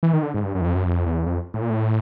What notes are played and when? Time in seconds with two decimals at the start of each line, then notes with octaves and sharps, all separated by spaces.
0.03 E3
0.13 D#3
0.23 D3
0.34 G#2
0.43 G2
0.55 F#2
0.61 E2
0.64 F2
0.75 F#2
0.86 F2
1.06 E2
1.26 F2
1.54 A2
1.62 A#2
1.70 A2